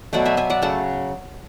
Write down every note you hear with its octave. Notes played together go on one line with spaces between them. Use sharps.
B2 F#3 A3 D5 F#5
E5 G#5
E5 G#5
D5 F#5
C#3 F#3 A3 F#5 A5